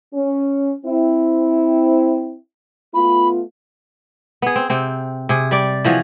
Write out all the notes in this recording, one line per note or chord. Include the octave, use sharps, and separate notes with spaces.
C#4
C4 E4
A3 B3 F4 B5
B3 G#4
C4
C3 C4
C3 G#4
G3 D5
E3 F3 F#4 G#4